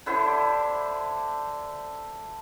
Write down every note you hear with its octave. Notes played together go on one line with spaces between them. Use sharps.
D3 E4 C5